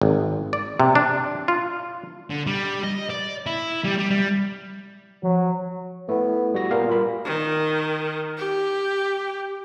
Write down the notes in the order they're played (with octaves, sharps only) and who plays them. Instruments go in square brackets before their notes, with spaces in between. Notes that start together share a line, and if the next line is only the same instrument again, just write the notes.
[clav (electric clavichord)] G#1
D5
C3
D4
F4
[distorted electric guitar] D3
G3
D#5
D5
E4
G3
G3
G3
[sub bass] F3 [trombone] F#3
[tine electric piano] A3 E4 [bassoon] B3
[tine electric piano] G3 F#4 A#6
[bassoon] A#2 [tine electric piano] G3 B3 F5
[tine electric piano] F4 A#4 B5
[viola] D#3
G4